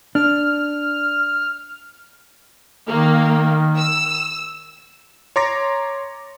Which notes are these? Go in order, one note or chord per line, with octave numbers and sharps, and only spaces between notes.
D4 F6
D#3 A#3
E6
C#5 A#5 C6 D6 A6 A#6